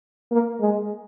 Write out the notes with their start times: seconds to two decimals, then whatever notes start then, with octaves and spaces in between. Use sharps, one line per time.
0.31 A#3
0.60 G#3